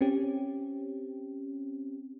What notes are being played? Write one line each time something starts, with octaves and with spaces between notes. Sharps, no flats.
C4 C#4 G4